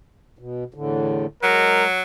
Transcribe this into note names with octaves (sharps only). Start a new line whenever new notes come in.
B2
E2 A2 D3
F#3 G#3 A#4